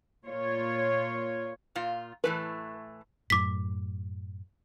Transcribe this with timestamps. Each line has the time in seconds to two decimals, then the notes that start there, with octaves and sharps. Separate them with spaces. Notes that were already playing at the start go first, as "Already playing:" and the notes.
0.24 A#2 F4 C#5
1.75 A#2 F4
2.24 A2 E3 A3 B4
3.30 F#2 A2 D6 B6